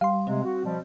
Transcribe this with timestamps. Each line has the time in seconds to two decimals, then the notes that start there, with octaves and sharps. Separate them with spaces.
0.01 G3 F5 C6
0.27 C3 G#3 C4
0.44 F#4
0.64 B2 F3 G3